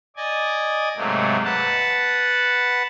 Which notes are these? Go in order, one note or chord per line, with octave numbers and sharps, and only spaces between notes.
D5 D#5 G#5
G#2 C3 F#3 A3 A#3
B4 F#5 A5